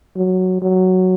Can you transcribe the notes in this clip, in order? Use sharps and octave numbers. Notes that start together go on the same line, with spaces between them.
F#3
F#3